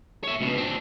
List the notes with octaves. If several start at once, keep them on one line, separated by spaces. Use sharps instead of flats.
C#5 E5
C#2 B2
C4 D4